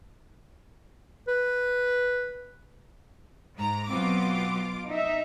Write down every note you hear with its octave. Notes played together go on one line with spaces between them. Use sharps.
B4
G#2 A#5
B2 F#3 B3 C4 F4 D6
D#4 E5